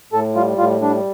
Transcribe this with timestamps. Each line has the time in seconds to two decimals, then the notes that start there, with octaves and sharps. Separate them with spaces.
0.12 A2 A4
0.35 G3 F4
0.58 A2 F4
0.81 G3 D4